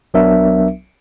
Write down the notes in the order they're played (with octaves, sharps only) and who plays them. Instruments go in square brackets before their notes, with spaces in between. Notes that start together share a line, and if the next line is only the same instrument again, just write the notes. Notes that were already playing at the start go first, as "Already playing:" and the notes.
[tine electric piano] B1 F#3 B3 D4 A#4 E5